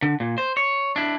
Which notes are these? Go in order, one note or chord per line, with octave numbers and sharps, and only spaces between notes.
D3
A#2
C5
C#5
D4 E4